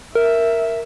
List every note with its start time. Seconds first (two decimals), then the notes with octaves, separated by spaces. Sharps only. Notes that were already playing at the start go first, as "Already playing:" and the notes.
0.15 A#4 E5